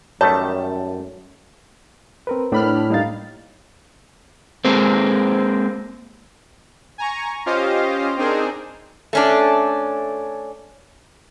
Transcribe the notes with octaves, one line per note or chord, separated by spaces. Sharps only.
F#2 D#3 G3 A3 C#5 A5
C4 A#4 B4
A2 D4 B5 F6
G3 A#3 D#4 F5 A6
G#3 A#3 C4
G#5 A#5 C#6
C#4 F4 G4 C5 D#5 F5
C4 D4 D#4 G#4 A#4 C5
A3 C#4 D4